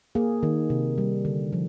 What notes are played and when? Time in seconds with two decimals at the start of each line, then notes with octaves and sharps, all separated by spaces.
0.15 A#3 G#4
0.43 D#3
0.70 C3
0.98 G3
1.25 D3
1.53 F3